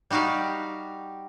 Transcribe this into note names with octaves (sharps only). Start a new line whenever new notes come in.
G3 D#4 F#4 G4 F5